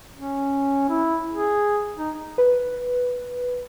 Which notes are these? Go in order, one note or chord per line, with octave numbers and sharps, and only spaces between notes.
C#4
E4
G#4
D#4
B4